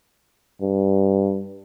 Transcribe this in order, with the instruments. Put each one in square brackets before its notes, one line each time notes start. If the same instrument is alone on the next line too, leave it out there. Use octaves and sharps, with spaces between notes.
[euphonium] G2